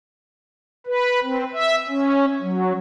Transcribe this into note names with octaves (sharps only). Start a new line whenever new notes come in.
B4
C4
E5
C#4
F#3